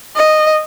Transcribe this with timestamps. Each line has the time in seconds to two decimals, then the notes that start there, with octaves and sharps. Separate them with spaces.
0.16 D#5